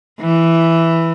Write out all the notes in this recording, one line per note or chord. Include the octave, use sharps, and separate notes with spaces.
E3